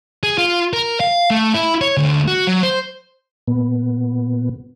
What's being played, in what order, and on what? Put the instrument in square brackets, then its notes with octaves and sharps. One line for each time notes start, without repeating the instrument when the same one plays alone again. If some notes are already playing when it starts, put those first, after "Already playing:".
[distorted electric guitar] G#4
F4
A#4
F5
A3
E4
C#5
D2
F#4
F#3
C5
[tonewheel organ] A#2 B3